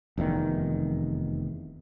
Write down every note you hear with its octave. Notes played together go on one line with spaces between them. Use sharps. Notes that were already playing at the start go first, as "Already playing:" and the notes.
F1 E2 G#2 D#3